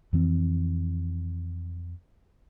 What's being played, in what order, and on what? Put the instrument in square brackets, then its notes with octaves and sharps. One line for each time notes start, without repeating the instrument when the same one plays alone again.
[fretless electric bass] F2 E3 C4